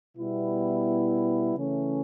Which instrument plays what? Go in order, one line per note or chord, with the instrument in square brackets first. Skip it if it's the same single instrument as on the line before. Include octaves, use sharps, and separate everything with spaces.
[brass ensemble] B2 G3 B3 E4
C#3 E3 A3 C#4